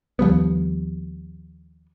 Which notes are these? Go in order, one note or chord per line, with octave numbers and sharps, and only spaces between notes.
D#2 F3 G3 B3